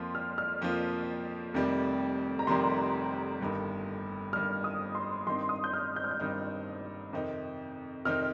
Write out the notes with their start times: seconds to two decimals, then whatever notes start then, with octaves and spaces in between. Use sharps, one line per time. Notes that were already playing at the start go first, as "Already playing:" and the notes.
Already playing: F2 F3 A#3 F4 C6
0.15 F6
0.38 F6
0.61 F2 F3 A#3 F4
1.54 F1 F2 C3 D#3 G3
2.39 A#5
2.47 F1 F2 C3 D#3 G3 C6
3.41 G1 G2 D#3
4.33 G1 G2 D#3 F6
4.64 D#6
4.95 C6
5.27 G2 D#3 C4 D#4 C6
5.49 D#6
5.64 G6
5.73 F6
5.96 G6
6.04 F6
6.11 G6
6.19 G2 D#3 C4 D#4
7.13 F2 C3 D#3 C4 D#4
8.05 F2 C3 D#3 C4 D#4 F6